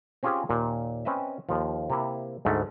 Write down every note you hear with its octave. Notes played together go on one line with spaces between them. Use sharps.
C4 C#4 F4 G4 G#4 C5
D#2 A#2
C4 C#4 B4 D#5 E5
D#2 F3
C3 A#3 E4
D2 G#2 A3